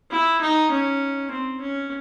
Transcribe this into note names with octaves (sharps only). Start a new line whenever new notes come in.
E4
D#4
C#4
C4
C#4